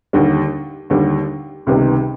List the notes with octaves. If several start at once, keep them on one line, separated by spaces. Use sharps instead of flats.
D#2 D3 G3
D#2 D3 G3
C#2 C3 D#3 G3 B3